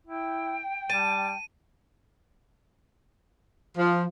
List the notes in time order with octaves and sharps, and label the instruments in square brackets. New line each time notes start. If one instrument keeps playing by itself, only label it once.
[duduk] E4 [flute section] G5
[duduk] G3 [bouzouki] A5 [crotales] D#7
[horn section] F3